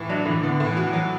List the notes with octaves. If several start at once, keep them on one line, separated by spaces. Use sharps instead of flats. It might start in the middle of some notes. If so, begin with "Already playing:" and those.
Already playing: A2 E3
F#3 D4
A2 E3
D3 B3
A2
E3
F#4
E3
F#3